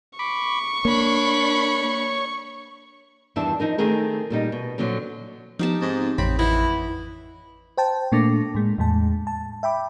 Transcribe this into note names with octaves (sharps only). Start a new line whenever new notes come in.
B5 C#6 D6
A#3 D4 C#5 B5
E2 G2 D#3 D4 E5
F3 D#4 A#4 D#5
D#3 A3 C4 G#4 A#4
A#2 G3 D#4
B2
A#2 D3 F3 F#3
F3 B3 D#4 G4 A5
G#2 C4 A6
A1 F2 C4 C#5 B5
E3 E4 D#5 F#5
C5 G5 A5
A#2 A3 A#3 D4 D6 A#6
A2 G#3
E2 A2 G#3 A5
A5
E5 G5 B5 D6